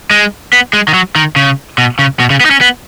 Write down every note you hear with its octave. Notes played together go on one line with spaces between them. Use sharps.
G#3
B3
G#3
D#3
F#3
D#3
C#3
B2
C#3
B2
C#3
B3
D#4
C#4
B3